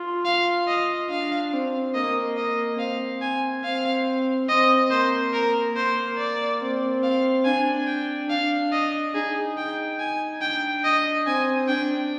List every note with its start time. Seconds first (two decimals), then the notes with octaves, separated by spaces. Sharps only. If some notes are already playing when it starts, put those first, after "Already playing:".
Already playing: F4
0.25 F5
0.68 D#5
1.10 D4 F5
1.53 C4
1.95 A#3 D#5
2.37 D#5
2.79 C4 F5
3.22 G#5
3.64 C4 F5
4.49 C4 D#5
4.91 A#3 C5
5.34 A#4
5.76 A#3 C5
6.18 D5
6.61 C4
7.03 F5
7.45 D4 G#5
7.88 G5
8.30 D4 F5
8.72 D#5
9.14 D#4 G#4
9.57 G5
10.00 G#5
10.42 D4 G5
10.85 D#5
11.26 C4 G#5
11.68 D4 G5